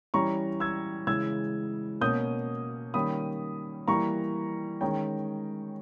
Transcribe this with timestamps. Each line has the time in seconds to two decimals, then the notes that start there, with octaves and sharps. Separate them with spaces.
0.14 E3 G3 C#4 A#5 C#6
0.60 E6 G#6
1.07 C#3 E3 G#3 E6 G#6
2.01 B2 A#3 C#4 D#6 G6
2.94 D#3 G3 A#3 C#4 B5 D#6
3.88 E3 G3 A#3 A#5 C#6
4.81 D#3 G#3 C#4 G5 A#5